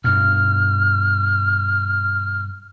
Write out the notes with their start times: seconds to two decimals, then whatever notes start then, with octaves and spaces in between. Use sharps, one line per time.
0.04 G2 B2 F6